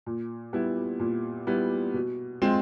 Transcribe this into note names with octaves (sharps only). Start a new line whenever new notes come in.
A#2
G3 B3 E4
A#2
G3 B3 E4
B2
G#3 C4 F4